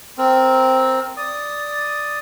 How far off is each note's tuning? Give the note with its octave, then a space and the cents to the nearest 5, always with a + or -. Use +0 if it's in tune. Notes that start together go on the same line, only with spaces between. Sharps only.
C4 +0 A#4 +0
D5 +0 D#6 +0